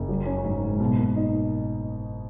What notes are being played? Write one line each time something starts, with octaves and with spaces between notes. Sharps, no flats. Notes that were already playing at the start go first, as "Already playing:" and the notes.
Already playing: F#1
F#3
C#4
G#2
G#2
B2
A#3
D#4